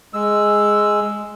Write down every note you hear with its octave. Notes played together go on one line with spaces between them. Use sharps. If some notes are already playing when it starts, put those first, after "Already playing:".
G#3 E6